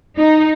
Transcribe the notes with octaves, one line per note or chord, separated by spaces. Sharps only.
D#4